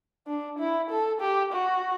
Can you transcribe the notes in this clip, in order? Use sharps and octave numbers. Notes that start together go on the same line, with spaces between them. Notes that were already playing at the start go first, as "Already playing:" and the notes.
D4
E4
A4
G4
F#4